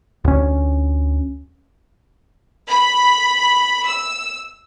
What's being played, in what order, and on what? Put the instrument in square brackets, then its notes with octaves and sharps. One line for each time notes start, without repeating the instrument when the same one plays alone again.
[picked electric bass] D2 C#4
[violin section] B5
E6